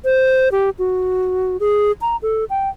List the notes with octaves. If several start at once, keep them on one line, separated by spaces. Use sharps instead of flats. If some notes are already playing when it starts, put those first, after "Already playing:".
C5
G4
F#4
G#4
A#5
A4
G5